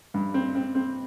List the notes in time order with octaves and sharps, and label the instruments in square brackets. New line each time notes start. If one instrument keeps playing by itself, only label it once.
[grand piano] G2
C4
C4
C4